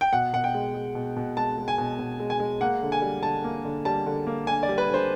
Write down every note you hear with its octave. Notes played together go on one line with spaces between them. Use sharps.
G5
B2 F#5
B2 F#5
G5
G#3
G#3
B2
B2
G#3 A5
G#3
G#5
B2
B2
G#3
G#5
G#3
A#3 F#5
D3
G#5
G3
D3 A5
A#3
D3
G3 A5
D3
A#3
D3 G#5
D5
G3
B4
D3
C5